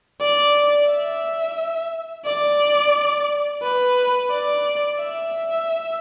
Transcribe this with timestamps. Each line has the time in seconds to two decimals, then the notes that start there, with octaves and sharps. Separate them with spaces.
0.21 D5
0.89 E5
2.25 D5
3.63 B4
4.31 D5
4.99 E5